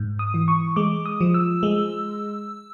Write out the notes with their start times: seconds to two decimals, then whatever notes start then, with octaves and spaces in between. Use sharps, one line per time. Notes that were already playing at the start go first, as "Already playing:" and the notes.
Already playing: G#2
0.19 D#6
0.34 E3
0.48 C#6
0.76 G#3 D6
1.06 D#6
1.21 F3
1.34 E6
1.63 G#3